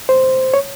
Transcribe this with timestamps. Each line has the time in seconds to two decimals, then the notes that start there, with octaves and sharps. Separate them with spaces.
0.09 C5
0.54 C#5